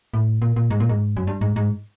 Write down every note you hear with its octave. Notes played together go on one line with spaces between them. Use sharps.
A2
A#2
A#2
G#2
A#2
G#2
F#2
G2
G#2
G#2